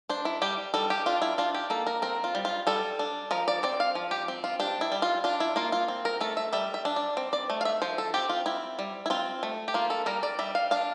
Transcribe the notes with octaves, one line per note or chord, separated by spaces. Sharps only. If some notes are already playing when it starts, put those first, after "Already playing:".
D4 C5
E4
G3 G4
G3 A4
G4
D4 F4
E4
D4 F4
G4
A#3 A4
A#4
C4 A#4
F4
G3
F4
G3 A4
D4
F3 A#4
D5
C4 D5
F5
F3
G4
C4
F4
D4 G4
E4
G3
F4
D4 F4
E4
A#3 F4
F4
C4
A#4
A3 A4
E5
G3 E5
E5
D4
D5
C4
D5
A3
F5
E5
F3 C5
A4
C4 G4
F4
C4 E4
G3
E4
C4 F4
A3
G4
A#3 F4
A4
G3 A#4
D5
G3 E5
F5
D4 F5